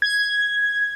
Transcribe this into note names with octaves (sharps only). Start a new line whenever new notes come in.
G#6